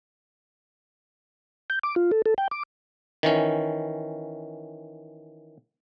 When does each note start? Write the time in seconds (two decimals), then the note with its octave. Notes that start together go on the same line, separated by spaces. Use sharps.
1.70 G6
1.83 D6
1.96 F4
2.12 A4
2.26 A4
2.38 G5
2.51 D6
3.23 D#3 E3 C#4